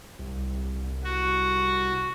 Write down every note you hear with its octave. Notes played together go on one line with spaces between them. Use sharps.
C2
F#4